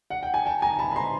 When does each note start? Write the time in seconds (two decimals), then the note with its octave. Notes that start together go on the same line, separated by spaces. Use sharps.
0.10 F#5
0.23 G5
0.34 G#5
0.46 G5 A5
0.62 G#5 A#5
0.79 A5 B5
0.92 B5
0.96 A#5 C6